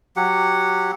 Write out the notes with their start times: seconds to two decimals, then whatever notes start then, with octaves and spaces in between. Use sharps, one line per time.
0.16 F#3 G4 F#5